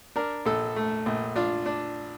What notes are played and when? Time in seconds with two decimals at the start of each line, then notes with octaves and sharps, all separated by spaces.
0.16 D4 A#4
0.46 A#1 A4
0.76 A3
1.06 A#1
1.36 D4 F4
1.66 D4